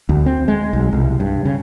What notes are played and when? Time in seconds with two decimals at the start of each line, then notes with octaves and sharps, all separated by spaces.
0.09 D2
0.26 C4
0.48 G#3
0.73 B1
0.93 C2
1.20 G2
1.45 C#3